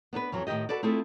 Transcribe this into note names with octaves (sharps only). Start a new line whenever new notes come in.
B3 D4 A4 B4
F2 E3 F#3
A2 D#3 E4 G4 D#5
F#4 A4 B4 D5
A3 C4 E4 F4 G#4 A4